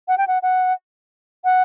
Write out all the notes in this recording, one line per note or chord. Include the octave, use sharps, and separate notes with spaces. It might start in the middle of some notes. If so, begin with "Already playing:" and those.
F#5
G5
F#5
F#5
F#5